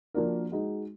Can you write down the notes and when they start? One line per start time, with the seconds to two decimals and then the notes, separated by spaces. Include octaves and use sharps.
0.14 F3 A#3 D4 F#4 A#4
0.52 G#3 D#4 F#4